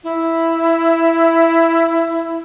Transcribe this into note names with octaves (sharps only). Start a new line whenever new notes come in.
E4